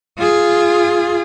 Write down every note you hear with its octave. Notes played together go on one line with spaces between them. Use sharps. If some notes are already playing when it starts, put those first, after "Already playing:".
F4 G#4